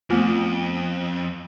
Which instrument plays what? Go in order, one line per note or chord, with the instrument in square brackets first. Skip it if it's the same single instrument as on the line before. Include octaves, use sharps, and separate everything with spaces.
[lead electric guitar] F2 [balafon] A3 B3 F4